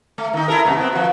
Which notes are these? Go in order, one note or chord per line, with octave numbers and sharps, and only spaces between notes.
A3
D#3 D#4
E4 A4 A#4
F#2 C3 A3
B3 C4
F3 F#4